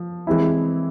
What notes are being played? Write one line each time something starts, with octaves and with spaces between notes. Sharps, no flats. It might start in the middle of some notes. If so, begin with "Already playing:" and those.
Already playing: F3
E3 G#3 C4 E4